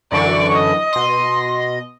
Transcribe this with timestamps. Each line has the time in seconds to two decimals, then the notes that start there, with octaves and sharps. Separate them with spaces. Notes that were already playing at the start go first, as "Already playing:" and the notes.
0.12 F#2 D3 E3 D5 C#6
0.54 D#5
0.93 B2 D#5 C6